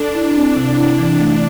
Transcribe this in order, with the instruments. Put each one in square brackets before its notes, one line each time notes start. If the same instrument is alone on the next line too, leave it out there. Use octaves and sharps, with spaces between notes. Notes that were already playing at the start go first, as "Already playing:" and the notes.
Already playing: [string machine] D4 [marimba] A4
[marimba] E4
C4
C3
E4
E3
A3